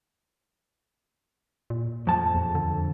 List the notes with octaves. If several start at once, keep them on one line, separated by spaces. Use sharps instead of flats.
A#2
F2 A5
E2
D3